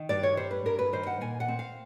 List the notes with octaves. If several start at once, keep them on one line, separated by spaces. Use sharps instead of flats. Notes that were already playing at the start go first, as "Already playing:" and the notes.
Already playing: D#3
G2 D5
C#5
G3 C5
B4
G2 A#4
B4
D#3 C5
F#5
A#2 G#5
F#5
C4
F5